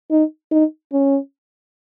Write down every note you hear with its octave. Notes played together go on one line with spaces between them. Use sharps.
D#4
D#4
C#4